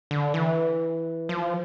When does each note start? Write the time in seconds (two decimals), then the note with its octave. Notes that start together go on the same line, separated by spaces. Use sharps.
0.11 D3
0.34 E3
1.29 F3